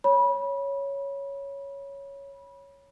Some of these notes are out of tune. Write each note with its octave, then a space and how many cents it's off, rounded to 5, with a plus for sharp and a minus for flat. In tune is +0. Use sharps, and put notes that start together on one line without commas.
C#5 +0 B5 -25